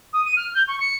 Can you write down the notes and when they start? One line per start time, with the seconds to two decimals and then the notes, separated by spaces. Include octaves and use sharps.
0.13 D#6
0.25 D#7
0.37 F6
0.55 G6
0.68 C#6
0.80 C#7